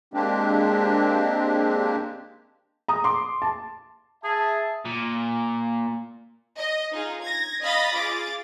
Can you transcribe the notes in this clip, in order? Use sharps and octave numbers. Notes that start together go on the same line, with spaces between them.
G#3 A#3 C4 D4 G4
A#5 D#6
C6 D6
A5
G#4 E5 A5
A#2
D#5
D#4 F4 G#4
G#6 A#6
D#5 F5 B5 D#6 A6 A#6
F4 G#4 D6 A6